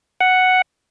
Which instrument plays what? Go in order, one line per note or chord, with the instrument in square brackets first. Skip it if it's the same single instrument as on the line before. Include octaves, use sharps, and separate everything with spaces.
[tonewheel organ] F#5